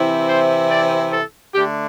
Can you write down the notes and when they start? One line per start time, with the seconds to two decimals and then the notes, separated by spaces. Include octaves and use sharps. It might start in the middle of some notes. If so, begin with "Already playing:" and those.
Already playing: C3 E3 C4 E4
0.29 C5
0.71 D5
1.13 A4
1.55 D3 A3 D4 G4